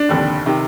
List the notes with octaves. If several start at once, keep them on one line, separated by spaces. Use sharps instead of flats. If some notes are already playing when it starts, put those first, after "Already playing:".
Already playing: D4
F1 D#2 D3
C3 D#3